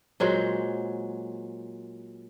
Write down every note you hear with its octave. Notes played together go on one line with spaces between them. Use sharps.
A#2 F#3 G#3 C5